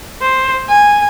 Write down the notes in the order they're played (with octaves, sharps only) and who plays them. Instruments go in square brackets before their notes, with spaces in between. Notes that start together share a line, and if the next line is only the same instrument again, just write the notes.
[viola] C5
G#5